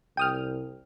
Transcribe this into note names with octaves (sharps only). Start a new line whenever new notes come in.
C2 G5 D#6 F6